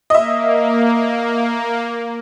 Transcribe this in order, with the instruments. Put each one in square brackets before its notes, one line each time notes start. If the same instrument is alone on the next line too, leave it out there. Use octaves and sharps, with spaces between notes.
[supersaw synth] A#3 [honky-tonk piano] D#5 E5